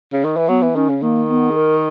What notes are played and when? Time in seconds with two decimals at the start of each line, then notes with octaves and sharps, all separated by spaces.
0.13 C#3
0.25 D#3
0.37 E3
0.48 F#3 B3
0.62 E3
0.75 D#3 C#4
0.89 C#3
1.02 D#3 A#3
1.30 B3
1.50 G#4
1.57 A#4